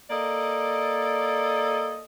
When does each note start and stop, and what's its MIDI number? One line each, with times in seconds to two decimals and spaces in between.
0.10 2.03 58
0.10 2.03 69
0.10 2.03 74
0.10 2.03 75